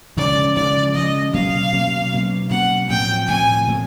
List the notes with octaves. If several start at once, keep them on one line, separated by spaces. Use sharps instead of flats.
C#3 F3 G#3 D5
C#3 F3 G#3 D5
C#3 F3 G#3 D#5
B2 F#3 A#3 C#4 F5
B2 F#3 A#3 C#4
B2 F#3 A#3 C#4
B2 F#3 A#3 C#4 F#5
A2 F3 A3 C4 G5
A2 F3 A3 C4 G#5
A2 F3 A3 C4